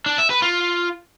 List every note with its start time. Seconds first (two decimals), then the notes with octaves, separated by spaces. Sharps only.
0.06 D4
0.18 E5
0.30 B4
0.42 F4